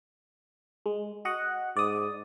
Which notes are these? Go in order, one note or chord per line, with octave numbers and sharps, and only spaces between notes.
G#3
F#4 D#5 F#5
G#2 D5 D#6